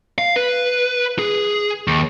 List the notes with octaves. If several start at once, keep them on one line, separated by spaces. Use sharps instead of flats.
F5
B4
G#4
D#2